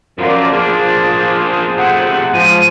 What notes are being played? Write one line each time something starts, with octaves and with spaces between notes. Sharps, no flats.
F#2 F3 F4 A#4 D5
A#3 D4 G#4 C5
C3 A3 F#5
G#2 F3 D#7